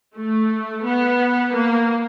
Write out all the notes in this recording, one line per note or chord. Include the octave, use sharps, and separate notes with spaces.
A3
B3
A#3